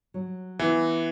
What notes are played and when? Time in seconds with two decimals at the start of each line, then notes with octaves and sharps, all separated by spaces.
0.14 F#3
0.59 E3 B3